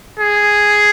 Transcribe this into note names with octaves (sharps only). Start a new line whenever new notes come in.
G#4